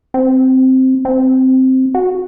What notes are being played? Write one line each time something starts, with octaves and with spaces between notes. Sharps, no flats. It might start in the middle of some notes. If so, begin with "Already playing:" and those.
C4
C4
F#4